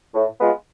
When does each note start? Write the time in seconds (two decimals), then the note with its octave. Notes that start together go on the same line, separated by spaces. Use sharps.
0.14 A2
0.40 G#3 B3 F4